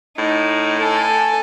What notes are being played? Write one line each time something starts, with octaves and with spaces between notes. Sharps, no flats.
A2 D#4
A4 G#5